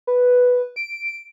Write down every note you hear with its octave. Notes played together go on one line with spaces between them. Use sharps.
B4
D7